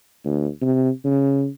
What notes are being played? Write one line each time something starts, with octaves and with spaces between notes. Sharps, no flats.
D2
C3
C#3